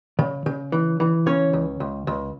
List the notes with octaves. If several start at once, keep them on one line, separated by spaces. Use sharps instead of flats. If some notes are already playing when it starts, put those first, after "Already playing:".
C#3
C#3
E3
E3
C#3 C#4 C#5
C#2
C#2
C#2